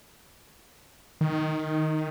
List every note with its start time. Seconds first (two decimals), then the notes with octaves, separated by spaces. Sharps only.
1.21 D#3